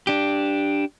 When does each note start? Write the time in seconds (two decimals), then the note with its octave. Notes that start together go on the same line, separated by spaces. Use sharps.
0.07 D4 G4